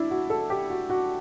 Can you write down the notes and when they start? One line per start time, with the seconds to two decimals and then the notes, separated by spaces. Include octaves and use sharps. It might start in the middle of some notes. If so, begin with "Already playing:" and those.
Already playing: D4 E4
0.11 F#4
0.30 A4
0.50 G4
0.70 F#4
0.90 F#4